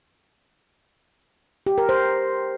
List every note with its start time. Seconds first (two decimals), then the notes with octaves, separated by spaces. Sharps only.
1.66 G4
1.78 A#4
1.89 C5